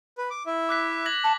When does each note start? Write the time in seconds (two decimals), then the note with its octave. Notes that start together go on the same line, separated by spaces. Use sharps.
0.18 B4
0.30 D6
0.46 E4 E5
0.69 D6 F#6 B6
1.05 G#6 A#6 F#7
1.24 A5